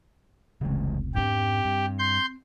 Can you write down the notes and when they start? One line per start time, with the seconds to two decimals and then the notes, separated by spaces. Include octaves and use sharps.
0.61 F1 C#2 C#3 E3 G#3
1.15 G#2 B3 C4 D4 G4
1.65 G2
1.99 C6 G6